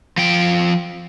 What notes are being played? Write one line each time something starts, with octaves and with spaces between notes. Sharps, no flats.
F3 G5